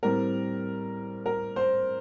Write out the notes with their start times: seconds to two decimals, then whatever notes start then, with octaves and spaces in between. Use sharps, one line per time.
0.03 A2 G3 C4 A#4
1.26 A#4
1.56 C5